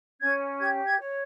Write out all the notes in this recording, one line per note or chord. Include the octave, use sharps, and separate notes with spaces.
C#4 G#6
G4 G#6
G#6
C#5